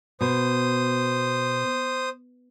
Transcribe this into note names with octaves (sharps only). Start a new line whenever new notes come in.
B2 C5 D#6